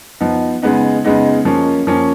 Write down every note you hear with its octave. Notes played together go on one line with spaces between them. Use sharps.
F3 B3 D#4
C#3 G#3 B3 D#4
C#3 G#3 B3 D#4
F3 A#3 C#4
F3 A#3 C#4